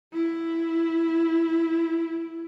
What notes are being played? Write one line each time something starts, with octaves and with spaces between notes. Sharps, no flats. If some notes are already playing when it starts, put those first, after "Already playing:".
E4